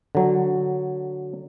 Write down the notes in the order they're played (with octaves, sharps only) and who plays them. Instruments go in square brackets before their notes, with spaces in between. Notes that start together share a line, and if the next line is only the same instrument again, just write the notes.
[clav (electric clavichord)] D3 F#3